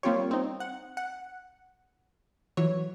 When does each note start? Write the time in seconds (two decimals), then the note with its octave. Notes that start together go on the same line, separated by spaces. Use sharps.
0.03 G3 A#3 C4 F4 G4 C#5
0.31 C4 D#4
0.60 F#5
0.97 F#5
2.57 E3 F#3 C#5